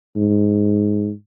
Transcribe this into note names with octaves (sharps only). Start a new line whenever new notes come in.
G#2